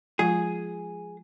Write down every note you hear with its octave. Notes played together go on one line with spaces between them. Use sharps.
F3 G#3 F4 G#4